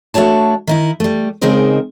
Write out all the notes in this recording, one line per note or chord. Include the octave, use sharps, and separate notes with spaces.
A3 D4 F#4 C#5 A5
D#3 D#4 E4
G3 A3
C#3 G#3 C4 D#4 A#4 C5